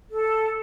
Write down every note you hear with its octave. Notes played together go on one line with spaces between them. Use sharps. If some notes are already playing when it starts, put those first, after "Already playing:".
A4